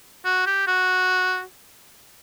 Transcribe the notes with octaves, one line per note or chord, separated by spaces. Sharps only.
F#4
G4
F#4